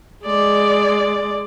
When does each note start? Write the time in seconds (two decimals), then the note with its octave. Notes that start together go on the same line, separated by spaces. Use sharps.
0.25 G#3 D5